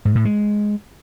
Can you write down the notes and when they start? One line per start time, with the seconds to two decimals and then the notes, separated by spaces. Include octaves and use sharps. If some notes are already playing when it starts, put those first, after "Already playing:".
0.05 G#2
0.15 A2
0.25 G#3